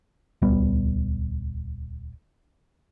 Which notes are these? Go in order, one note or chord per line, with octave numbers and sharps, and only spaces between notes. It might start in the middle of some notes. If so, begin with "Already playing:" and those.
D#1 C#2 G3 B3